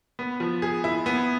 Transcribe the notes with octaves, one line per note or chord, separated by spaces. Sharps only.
B3
F3
G#4
E4
B3